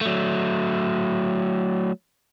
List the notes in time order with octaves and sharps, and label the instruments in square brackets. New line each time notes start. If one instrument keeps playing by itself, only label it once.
[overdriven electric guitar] F#3 A3